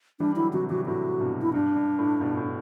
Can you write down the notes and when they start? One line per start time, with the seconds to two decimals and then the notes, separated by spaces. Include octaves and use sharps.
0.20 E3 G3 D4
0.36 D3 F#3 E4
0.53 C3 E3 F#4
0.70 C3 E3 F#4
0.86 A2 C3 F#4
1.20 G2 B2
1.42 E4
1.54 G2 D4
1.76 G2
1.98 A2
2.21 G2 B2
2.37 A2